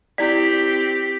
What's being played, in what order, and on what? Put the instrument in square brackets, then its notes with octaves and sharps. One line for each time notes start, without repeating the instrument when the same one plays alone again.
[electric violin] C4 G4 [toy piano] E4 C5 D5 [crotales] B6